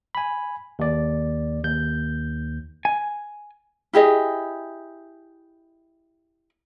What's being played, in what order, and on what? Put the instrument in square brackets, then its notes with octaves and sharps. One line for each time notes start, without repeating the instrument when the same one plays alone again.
[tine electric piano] G#5 B5
D#2 D5
D#2 G6
[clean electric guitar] G#5
[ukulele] E4 G4 G#4 D#5